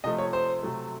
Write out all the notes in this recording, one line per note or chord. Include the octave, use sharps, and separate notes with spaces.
C3 F3 A3 D#5
C#5
C5
C3 F#3 A3